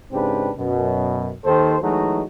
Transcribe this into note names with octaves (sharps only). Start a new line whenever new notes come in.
G#2 C#3 C4 D4 G4 B4
F#2 B2
D#2 D#3 A4 C5
E3 F#3 G#3 A3 D#4 F#4